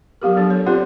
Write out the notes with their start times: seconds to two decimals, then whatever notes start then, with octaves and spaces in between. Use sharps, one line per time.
0.22 F#3 B3 G4 A#4
0.36 F#3 D4 A4
0.50 C#5
0.66 C4 F4 G4 C5 D5